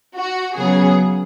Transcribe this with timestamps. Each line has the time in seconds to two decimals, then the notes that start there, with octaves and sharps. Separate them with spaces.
0.15 F#4
0.55 C#3 F#3 B3 G#4